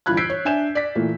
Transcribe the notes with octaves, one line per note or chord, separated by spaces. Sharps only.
G1 E3 F4 B5 F#6 G#6
E6 G6 G#6 B6 C7 D7
C#5
D4 E5 G#5 G6 E7
D5 B6
A#2 E3 A3